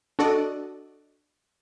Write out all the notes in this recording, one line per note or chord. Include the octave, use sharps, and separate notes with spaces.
D4 F#4 A4 D5 D#5